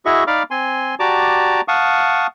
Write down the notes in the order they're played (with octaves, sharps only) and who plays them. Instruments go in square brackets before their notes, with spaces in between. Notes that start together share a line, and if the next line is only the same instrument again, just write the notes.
[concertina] E4 F#4 G#4 D#5 E5 C#6
D#4 D5 F5 B5 D6 F6
C4 G#5 C6
F#4 G4 D5 A5 A#5 D6
F5 F#5 A5 C#6 D#6